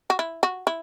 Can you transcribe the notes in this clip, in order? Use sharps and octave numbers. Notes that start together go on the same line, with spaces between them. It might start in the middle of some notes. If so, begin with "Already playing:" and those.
F#4
E4
F#4
E4